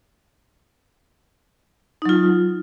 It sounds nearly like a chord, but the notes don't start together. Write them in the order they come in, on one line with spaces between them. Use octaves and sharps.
D#4 F#3 F4